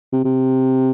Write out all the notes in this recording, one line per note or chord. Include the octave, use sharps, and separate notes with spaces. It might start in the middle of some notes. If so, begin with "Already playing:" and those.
C3
C3